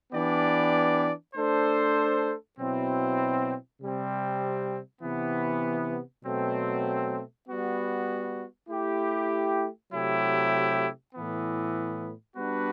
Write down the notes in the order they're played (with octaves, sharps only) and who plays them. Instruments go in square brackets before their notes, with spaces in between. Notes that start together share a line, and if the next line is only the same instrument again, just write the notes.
[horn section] E3 B3 D4 G4 D5
A3 D4 A4 C5
B2 F#3 C4 E4
C3 G3 C4
C3 E3 B3
B2 F#3 A3 C4
G3 B3 F#4
A3 E4 G4
C3 F#3 A3 E4 G4
A2 E3 B3
G3 B3 D4 F#4 B4